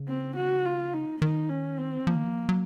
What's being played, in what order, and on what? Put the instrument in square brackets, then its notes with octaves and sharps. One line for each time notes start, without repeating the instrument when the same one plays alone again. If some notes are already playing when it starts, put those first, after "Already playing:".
Already playing: [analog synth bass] C#3
[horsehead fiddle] C4
F#4
F4
D#4
[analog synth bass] D#3 [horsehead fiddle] D#4
[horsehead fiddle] C#4
C4
[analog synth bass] F3 [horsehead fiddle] A#3
[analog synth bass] D#3
F3
F#3